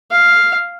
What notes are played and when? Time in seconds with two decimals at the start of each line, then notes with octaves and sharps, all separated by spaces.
0.11 F5